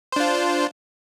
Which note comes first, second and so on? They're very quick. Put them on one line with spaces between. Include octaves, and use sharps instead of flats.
C5 D4 F4